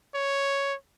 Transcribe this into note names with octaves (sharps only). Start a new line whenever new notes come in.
C#5